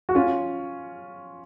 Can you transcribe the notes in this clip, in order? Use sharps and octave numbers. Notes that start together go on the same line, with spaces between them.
F#4
C#4 F4